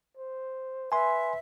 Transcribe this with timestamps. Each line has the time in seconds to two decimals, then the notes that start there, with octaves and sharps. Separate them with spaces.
0.17 C5
0.92 B4 E5 G#5 C6